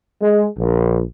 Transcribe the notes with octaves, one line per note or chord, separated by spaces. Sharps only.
G#3
A#1